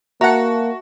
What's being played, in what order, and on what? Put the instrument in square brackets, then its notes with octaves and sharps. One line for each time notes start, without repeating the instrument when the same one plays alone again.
[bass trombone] A#3 [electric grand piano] F#4 [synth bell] E5 A5 [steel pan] F#5 A#5